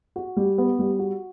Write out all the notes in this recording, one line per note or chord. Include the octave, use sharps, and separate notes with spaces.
F#4
G3
B3
G3
F#4